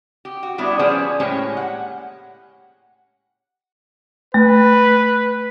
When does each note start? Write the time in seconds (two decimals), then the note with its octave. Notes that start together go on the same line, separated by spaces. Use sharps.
0.25 G4
0.43 F#4
0.58 G3 B3 D4 E4 F#4
0.79 F3 B3 C#4 G#4 C5 D5
1.20 A2 G#3 A#3 C#4 G4 C#5
1.57 F#5
4.34 A3 B4